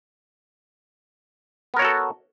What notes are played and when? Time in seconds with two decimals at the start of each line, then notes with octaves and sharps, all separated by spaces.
1.74 B3
1.76 A#4
1.79 C#5
1.82 F#4
1.85 A4